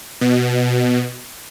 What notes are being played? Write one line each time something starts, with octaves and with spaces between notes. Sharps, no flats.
B2